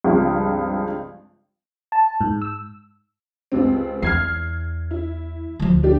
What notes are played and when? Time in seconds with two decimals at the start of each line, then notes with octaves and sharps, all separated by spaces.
0.04 C#2 G2 F3 C4
1.92 A5
2.21 G#2
2.42 E6
3.52 C#2 C3 C4
4.02 E2 F6 G#6 C7
4.91 E4
5.59 D2 F3
5.83 D4 G4